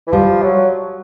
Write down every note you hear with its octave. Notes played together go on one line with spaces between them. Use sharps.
E3
F3 G3
F#3